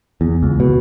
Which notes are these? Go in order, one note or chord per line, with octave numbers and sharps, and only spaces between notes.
E2
C#2
B2